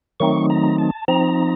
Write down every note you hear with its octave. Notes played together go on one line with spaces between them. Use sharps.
D#3 F#3 A3 C4 D#4 C#6
A#5
A5
F3 C4 D#4 A#5